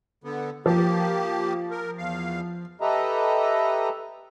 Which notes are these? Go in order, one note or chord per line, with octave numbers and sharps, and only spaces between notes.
D3 B3
F3 A#3 G4
A#4
E2 F5
G4 A4 B4 D#5 E5 A#5